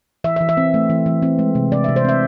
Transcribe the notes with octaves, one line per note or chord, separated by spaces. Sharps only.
E3 E5
E5
E3
E5
C4
A3
E3
E3
C4
G#3
C3
C3 D5
E5
C3
C5
C4 E5